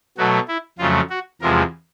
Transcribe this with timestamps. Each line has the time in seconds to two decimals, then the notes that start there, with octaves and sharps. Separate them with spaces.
0.18 B2 F#3 A3 F#4
0.48 E4
0.79 F2 C#3 F#3 A3 F4
1.10 F#4
1.41 E2 C3 F3 G#3 A#4